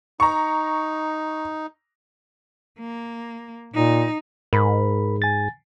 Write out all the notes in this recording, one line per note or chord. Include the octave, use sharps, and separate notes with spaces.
D#4 A#5 C#6
A#3
A#2 D#4
G#2 A#4 B5
G#5 A6